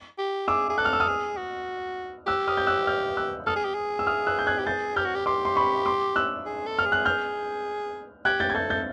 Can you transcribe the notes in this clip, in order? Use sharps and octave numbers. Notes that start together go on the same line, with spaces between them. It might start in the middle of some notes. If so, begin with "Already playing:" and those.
G4
G#4 D6 E6
G#4
A4 F#6
F6
E6
D#6 F6
G#4
F#4
G4 E6 F#6
D#6 F6
G6
E6 F#6
F6 G6
E6 F#6
A4 D#6 F6
G#4
G4
G#4
E6
D#6 F6
E6 F#6
G6
F#6 G#6
G4
G#4 G6 A6
G4 F6 G6
F#4
G4
G4 C6 D6
C6
B5 C#6
C6 D6
E6 F#6
G#4
A4
F6
G#4
F#6
F6 G6
G4 F#6 G#6
G6 A6
G#6
A4 G6 A6
G6 A6